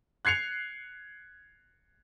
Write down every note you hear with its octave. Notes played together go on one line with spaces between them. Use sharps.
F#6 G#6 C7 C#7 F7